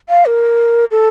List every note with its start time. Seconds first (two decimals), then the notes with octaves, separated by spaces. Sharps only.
0.09 F5
0.26 A#4
0.91 A4